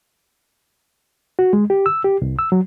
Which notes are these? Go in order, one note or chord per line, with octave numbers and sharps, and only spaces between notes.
F#4
G#3
G4
E6
G4
C2
E6
F#3